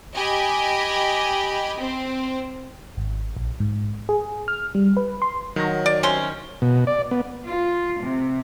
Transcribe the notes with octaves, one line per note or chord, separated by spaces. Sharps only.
G4 D#5 G#5 B5
C4
G#1
A#1
G#2
G#4
F6
G3
B4
C6
D#3 F#3 A#6
D5
C3 C#4 C6
B2
D5
B3
F4
C3